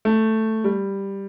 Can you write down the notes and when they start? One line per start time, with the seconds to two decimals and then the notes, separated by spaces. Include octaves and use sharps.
0.05 A3
0.64 G3